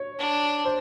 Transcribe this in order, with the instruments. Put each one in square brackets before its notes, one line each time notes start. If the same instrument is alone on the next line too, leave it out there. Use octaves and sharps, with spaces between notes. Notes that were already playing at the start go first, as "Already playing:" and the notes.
Already playing: [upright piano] C#5
[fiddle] D4
[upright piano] C5